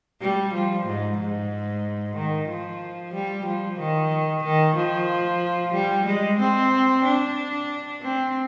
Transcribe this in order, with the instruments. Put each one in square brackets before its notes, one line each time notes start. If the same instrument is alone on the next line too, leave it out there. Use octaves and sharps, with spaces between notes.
[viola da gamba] G3
F3
G#2
G#2
D#3
F3
G3
F3
D#3
D#3
F3
G3
G#3
C4
D4
C4